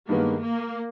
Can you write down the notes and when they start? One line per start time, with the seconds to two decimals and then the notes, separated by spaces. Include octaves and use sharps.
0.08 G2 D#3 G#3 A#3 B3
0.43 A#3